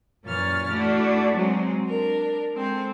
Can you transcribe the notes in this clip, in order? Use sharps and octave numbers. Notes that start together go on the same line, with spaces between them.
F#2 A#2 E3 C#5 F6 A6
A3 D4 E4 F#4
F#3 G#3 C4
D4 A#4
G#3 C4 A4 C5